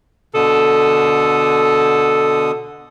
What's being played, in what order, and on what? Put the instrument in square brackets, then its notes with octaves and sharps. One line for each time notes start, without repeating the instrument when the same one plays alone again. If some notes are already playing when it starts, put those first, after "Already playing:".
[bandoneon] B2 D3 D#6 [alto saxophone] A4